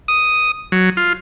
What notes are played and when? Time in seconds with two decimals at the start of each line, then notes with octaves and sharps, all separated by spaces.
0.08 D#6
0.72 F#3
0.97 F4